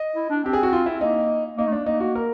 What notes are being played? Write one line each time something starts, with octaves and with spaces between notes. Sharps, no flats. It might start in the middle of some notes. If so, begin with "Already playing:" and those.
Already playing: D#5
E4
D4
C4 G4
G#4
F#4
F4
E4
A#3 D#4
A#3 D#4
A3
A#3 D4
A#3 D#4
F#4
A#4